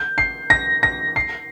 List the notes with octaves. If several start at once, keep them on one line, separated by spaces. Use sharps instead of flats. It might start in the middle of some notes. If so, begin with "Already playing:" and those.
Already playing: G6
C7
A#6
A#6
C7